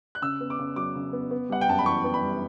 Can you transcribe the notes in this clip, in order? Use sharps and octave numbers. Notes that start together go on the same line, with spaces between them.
F#6
C#3 E6
B3
D6
C#3
F#3 D6
C#3
B3
B3
G3 F#5
G5
F#2 A5
B5
E3 C#6
B3
B5
G3